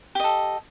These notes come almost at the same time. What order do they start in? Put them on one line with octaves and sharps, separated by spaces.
G4 D#5 A4